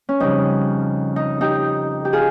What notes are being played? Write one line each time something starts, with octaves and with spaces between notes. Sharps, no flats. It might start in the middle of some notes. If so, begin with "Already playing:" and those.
C#4
F2 C#3 G3 D#4
D#4
D#4 G4
G4
F4 G#4